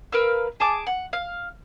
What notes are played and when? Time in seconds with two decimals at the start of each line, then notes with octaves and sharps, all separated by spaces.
0.12 A#4 B4 F5 E6
0.60 G#4 A5 D6
0.87 F#5
1.13 F5